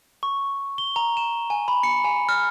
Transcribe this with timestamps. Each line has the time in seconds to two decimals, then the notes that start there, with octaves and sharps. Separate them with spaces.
0.23 C#6
0.78 G7
0.96 A#5
1.17 E7
1.50 G#5
1.68 B5
1.83 C#7
2.04 G#5
2.29 F6